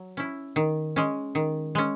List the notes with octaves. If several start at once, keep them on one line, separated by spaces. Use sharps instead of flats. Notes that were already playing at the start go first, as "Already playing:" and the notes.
Already playing: F#3
C#4 E4
D#3
G#3 C#4
D#3
G#3 C#4